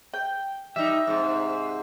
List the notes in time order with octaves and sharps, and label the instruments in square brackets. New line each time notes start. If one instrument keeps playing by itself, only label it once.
[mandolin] G5
[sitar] G3 D#4 [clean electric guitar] E5
[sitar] G#2 C3